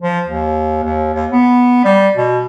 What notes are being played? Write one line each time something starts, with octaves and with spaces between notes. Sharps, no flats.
F3
D#2
D#2
D#2
B3
G3
B2